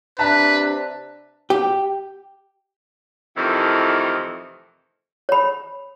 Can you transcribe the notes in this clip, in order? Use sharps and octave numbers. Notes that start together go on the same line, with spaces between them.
C3 D4 B4 E5 A5 A#5
G4
F2 A2 C3 D#3 E3
C#5 B5